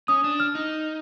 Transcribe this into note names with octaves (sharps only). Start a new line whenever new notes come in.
C#4 D#6
D4
F6
D#4